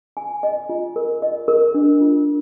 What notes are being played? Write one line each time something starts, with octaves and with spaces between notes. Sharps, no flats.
G#5
D#5
F4
A#4
D#5
A#4
D4
F4